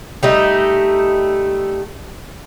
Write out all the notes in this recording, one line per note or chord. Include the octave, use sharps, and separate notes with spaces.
G3 A3 D#4